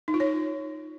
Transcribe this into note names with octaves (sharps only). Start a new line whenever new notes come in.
D#4
F4
C#5